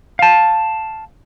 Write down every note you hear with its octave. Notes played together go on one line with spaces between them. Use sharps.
F5 A5